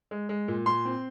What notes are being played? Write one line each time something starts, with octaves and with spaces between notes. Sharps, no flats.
G#3
G#3
A#2
A#2 C6
C4